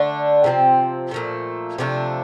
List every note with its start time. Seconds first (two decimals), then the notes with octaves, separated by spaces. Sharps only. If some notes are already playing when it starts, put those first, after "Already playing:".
Already playing: D3 A3 D4
0.44 C3 F3 C4
1.11 A#2 F3 A3
1.78 C3 F3 A3 D4